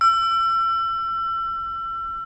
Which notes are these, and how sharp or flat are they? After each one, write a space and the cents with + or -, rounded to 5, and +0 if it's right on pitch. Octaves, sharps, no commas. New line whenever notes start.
E6 +35